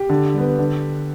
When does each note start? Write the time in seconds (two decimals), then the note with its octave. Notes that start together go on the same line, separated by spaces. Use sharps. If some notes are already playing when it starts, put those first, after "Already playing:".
Already playing: G4
0.10 D3
0.34 G3 B3
0.59 D3